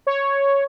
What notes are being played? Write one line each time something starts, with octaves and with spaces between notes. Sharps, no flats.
C#5